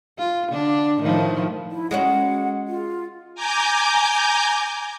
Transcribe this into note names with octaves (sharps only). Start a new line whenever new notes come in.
F4
D3 D4
A2 D#3 F3
E4
G#3 C#4 F#4 F#5
F4
G#5 A#5 D6 G6